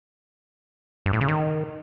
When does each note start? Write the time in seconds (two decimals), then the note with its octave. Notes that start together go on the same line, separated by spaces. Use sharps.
1.06 G2
1.13 A2
1.21 C#3
1.28 D#3